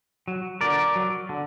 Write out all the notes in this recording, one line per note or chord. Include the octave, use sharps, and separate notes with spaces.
F#3
D3 A#4 D5
F#3
D3